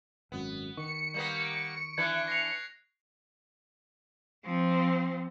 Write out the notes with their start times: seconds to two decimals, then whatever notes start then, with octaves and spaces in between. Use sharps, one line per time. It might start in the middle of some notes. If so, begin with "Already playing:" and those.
0.32 G#1 F#2 B3
0.77 D#3 C#6 C#7
1.14 G3 A#3 B3
1.45 D7
1.98 E3 D4 B4 F#6 G#6
2.28 A#6 C7 F7
4.45 F3 C4